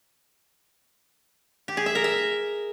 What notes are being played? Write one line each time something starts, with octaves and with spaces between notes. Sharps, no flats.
G4
G#4
E5
A#4
E5